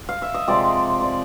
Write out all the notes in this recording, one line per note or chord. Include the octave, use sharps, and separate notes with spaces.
F5
E5
D#5
C3 F3 G#3 C4 D5
D5